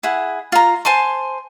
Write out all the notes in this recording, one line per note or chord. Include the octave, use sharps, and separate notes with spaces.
E4 G#4 F#5
F4 A#5
C5 G#5 A5 C6